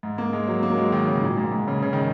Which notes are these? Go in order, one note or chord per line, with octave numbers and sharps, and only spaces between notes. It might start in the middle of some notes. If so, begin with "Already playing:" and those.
G#2
A#3
G#3
F#3
A#3
F#3
G#3
D#3
C#3
A#2
G#2
G#2
C#3
C#3
D#3